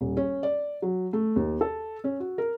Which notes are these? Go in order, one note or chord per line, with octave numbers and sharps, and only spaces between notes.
D#1
C#4
D5
F#3
A3
D#2
A4
C#4
F#4
A#4